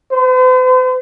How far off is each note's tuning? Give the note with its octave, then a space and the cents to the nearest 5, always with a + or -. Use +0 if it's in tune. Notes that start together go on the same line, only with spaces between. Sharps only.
C5 -45